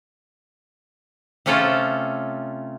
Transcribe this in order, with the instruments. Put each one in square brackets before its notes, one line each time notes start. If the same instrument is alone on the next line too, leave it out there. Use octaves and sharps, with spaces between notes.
[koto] C3 A3 C#4 F4 A4